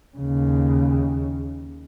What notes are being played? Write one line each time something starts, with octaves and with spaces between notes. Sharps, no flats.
D#2 C#3